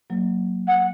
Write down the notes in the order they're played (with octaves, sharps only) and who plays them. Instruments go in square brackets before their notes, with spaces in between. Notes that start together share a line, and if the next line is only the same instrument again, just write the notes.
[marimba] F#3 A#3
[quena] F#5